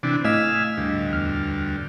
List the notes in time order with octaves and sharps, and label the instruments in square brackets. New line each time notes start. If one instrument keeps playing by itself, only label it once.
[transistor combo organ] C3 E3 D4
[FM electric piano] A2 D#5 B6 [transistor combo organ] F5 G#5 E6
[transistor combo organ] D2 G2
[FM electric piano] E2 F6